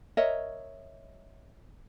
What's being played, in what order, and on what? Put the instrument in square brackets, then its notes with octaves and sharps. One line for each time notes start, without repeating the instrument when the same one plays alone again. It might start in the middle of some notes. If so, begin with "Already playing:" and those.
[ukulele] A#4 C#5 D#5 E5